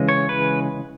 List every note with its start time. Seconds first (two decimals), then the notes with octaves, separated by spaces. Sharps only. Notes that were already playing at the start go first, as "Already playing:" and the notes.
Already playing: C#3 E3 G#3
0.09 C#5
0.29 B4